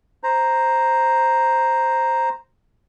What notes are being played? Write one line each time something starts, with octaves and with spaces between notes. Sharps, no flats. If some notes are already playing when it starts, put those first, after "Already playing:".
C5 A#5